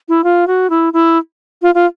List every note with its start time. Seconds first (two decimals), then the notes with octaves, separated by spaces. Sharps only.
0.09 E4
0.24 F4
0.47 F#4
0.70 E4
0.93 E4
1.62 F4
1.75 F4